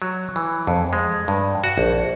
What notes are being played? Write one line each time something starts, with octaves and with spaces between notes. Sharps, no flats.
F#3
E3
F2
G#3
G2
F#4
A#1